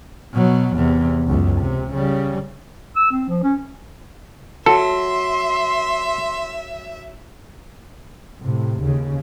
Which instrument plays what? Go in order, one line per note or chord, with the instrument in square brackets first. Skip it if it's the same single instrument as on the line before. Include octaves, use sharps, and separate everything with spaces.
[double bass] B2 F#3
E2 C3
C#2 F#2
C3
C#3 G3
[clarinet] E6
C4
F3
C#4
[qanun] F#3 [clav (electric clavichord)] A4 [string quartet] E5 [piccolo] C6
[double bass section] A2 C3
D#2 C#3